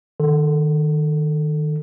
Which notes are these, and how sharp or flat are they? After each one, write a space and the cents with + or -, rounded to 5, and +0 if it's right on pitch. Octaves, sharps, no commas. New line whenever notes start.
D#3 -20 A4 +0